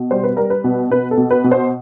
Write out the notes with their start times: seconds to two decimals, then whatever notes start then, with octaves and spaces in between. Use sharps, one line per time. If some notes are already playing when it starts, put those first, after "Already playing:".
Already playing: B2
0.11 G3 C5
0.24 B4
0.37 G3 A#4
0.50 B4
0.64 B2
0.91 B2 B4
1.11 A4
1.18 B2
1.31 B4
1.44 B2
1.52 C5